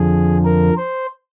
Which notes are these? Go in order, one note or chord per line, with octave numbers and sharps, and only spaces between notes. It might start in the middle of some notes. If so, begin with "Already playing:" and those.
Already playing: F2 D3 F3 G#4
A#4
C5